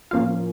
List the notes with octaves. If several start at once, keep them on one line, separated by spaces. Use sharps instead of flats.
A2 F3 A#3 C#4 F4 F5